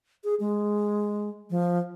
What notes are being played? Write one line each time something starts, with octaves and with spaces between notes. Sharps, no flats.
G#4
G#3
F3